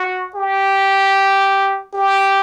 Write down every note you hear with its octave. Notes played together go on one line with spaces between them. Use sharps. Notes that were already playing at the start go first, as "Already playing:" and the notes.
Already playing: F#4
G4
G4